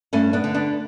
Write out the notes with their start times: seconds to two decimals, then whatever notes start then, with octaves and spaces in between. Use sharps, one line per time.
0.13 G2 A3 C#4
0.33 B3 D4
0.44 D3
0.54 B3 D4